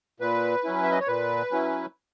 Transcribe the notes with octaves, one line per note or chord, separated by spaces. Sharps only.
A#2 B4
F#3 C#4 E4
E5
D#5
C#5
A#2 B4
F#3 C#4 E4